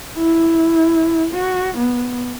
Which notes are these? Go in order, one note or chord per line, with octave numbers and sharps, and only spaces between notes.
E4
F#4
B3